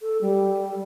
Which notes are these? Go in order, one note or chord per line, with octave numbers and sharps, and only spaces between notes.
A4
G3